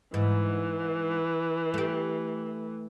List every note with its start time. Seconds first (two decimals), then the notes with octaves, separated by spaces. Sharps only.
0.14 G#2 E3
1.74 A3 G4